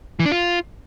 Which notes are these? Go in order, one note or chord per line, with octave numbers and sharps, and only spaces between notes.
E3
D4
F4